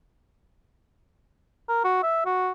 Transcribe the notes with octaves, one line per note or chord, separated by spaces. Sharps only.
A#4
F#4
E5
F#4